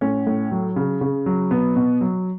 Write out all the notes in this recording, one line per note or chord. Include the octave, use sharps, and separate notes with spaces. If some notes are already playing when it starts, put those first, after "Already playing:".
A2 C#4
A2
F#3
C#3
C#3
F#3
B2 B3
B2
F#3